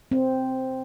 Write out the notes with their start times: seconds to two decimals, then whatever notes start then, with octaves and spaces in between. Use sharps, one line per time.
0.11 C4